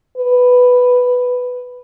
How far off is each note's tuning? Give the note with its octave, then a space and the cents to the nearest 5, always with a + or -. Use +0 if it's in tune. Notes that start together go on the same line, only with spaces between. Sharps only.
B4 +5